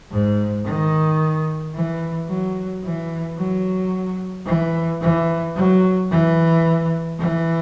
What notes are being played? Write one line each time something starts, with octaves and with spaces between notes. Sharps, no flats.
G#2
D#3
E3
F#3
E3
F#3
E3
E3
F#3
E3
E3